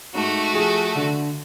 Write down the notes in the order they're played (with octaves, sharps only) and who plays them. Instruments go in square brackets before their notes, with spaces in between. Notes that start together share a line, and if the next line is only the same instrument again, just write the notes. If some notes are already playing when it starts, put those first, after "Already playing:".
[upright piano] G#2 [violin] A3 F#4
[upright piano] F3 G#4
D3